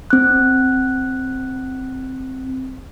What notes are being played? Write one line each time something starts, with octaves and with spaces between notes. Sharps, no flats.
C4 F#6